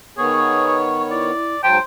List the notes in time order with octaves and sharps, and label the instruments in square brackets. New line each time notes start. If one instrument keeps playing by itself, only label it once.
[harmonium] D#3 B3 C#5 [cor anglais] G#4 [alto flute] C#6
[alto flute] E4 [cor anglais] D5
[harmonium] G#2 F#3 A5 [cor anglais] C5 [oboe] G5